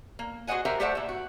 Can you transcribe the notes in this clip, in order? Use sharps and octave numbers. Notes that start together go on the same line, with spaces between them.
A#3
F#4 G#4 C5 D#5 F#5 G#5
G4 A#4 C5 E5 F#5
A3 G4 C5 D5 E5 F#5
A#2 E5
F#4